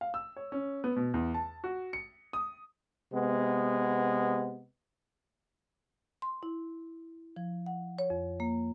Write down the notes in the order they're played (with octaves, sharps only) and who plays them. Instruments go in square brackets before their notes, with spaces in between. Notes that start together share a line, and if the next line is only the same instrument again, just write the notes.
[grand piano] F5
E6
C#5
C#4
B3
B2
E2
A5
F#4
C#7
D#6
[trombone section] C3 G#3 B3
[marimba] C6
E4
F3
F#5
C#5
F2
A#3